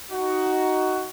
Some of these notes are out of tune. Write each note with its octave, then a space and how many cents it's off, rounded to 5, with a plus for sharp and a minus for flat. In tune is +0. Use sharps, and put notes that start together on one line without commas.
D#4 +0 F#4 +10